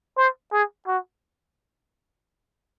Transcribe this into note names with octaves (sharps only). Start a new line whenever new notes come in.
C5
G#4
F#4